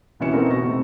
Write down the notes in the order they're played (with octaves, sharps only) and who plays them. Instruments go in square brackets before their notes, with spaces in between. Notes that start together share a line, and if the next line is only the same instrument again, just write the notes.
[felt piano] C2 B2 E3 C#4 C#7 E7
B3 C4 D#4 E4 A4 A#4
B2 C#6 A#6
C3 A3 C4